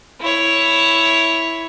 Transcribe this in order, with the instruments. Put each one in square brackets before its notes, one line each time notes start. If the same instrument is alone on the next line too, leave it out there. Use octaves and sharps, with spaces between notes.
[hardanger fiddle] E4 C#5